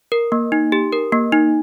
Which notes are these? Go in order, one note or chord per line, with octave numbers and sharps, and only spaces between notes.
A#4
A#3
D#4
G4
A#4
A#3
D#4